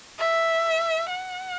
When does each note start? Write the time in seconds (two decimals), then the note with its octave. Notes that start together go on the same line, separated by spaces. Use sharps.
0.19 E5
1.10 F#5